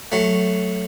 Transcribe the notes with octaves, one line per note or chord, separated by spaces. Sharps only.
F#3 A3